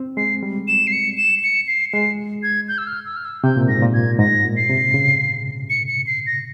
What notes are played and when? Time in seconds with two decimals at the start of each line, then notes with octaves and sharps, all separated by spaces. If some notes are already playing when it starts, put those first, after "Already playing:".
Already playing: C4
0.17 G#3 C7
0.43 G3
0.68 E7
0.87 C7
0.92 C#7
1.17 E7
1.43 C#7
1.68 C7
1.93 G#3 C7
2.43 G#6
2.68 G6
2.78 E6
2.87 F6
3.06 E6
3.16 F6
3.25 E6
3.43 C3 G6
3.56 A#2
3.68 G#2 A#6
3.82 A#2
3.94 G#6
4.19 G#2 A#6
4.45 A#2
4.57 C7
4.69 C3
4.94 C#3
5.70 C#7
5.88 C#7
6.07 C7
6.26 A#6